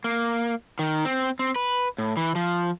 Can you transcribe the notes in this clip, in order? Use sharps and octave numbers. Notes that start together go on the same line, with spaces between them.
A#3
D#3
C4
C4
B4
A2
E3
F3